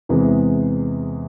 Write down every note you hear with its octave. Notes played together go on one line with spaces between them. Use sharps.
E2 C3 E3 G#3